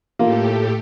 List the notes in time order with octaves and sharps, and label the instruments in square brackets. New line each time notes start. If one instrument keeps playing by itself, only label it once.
[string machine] A2 A3 G4 [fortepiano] A#3 F4